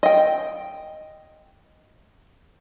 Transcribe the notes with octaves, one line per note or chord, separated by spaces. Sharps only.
D#5 G5